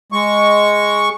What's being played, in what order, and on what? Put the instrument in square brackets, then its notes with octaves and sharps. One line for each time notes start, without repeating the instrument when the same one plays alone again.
[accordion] G#3 C#6